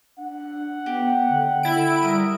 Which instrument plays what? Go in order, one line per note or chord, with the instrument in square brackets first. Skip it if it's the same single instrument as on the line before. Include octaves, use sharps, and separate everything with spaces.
[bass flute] D4 [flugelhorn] F#5
[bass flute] B3 [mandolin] G4
[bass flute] D3
[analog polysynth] E4 D7
[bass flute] G3 [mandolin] A#4 D#6